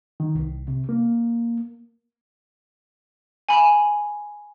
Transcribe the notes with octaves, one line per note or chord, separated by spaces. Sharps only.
D#3
C2
C3
A#3
G#5 B5